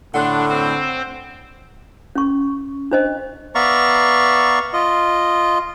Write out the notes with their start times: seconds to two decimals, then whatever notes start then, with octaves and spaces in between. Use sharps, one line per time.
0.14 A2 D3 D4 F#5 C6 F#6
0.49 C4 C5
2.15 C#4 C#6
2.91 D4 C5 D#5
3.55 B3 D5 E5 F5 A#5 C#6
4.73 F4 D#5